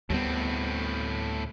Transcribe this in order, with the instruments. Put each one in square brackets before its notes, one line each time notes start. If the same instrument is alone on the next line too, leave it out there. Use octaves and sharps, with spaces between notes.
[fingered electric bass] D2 G3 B3 [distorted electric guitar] A2 C4